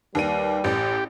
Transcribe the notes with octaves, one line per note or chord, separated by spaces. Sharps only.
D#2 G3 B4 D#7
A1 G4